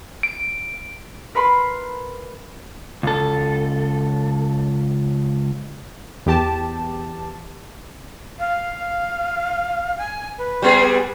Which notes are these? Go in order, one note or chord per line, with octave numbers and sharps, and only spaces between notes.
D7
A#4 B4 B5 C6
C#2 A4
E2 G4 A5
F5
G#5
B4
G3 B3 G#4